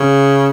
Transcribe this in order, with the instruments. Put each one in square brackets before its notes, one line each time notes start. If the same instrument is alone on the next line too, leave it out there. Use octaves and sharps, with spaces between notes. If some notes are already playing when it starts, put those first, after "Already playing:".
Already playing: [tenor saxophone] C#3